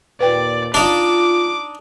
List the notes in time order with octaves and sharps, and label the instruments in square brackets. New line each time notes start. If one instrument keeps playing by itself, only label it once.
[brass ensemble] D#2 A#2 [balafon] B4 G5 [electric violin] D5
[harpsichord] D4 D#4 [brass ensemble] F4 [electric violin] D6